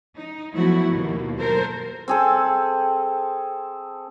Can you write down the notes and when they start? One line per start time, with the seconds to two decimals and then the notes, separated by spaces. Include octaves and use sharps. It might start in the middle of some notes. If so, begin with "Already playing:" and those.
0.16 D#4
0.53 F3 F#3 A3 B3 E4 F#4
0.93 D#2 B2 A#3
1.37 F#3 A4 A#4 C5
2.08 C4 G#4 A4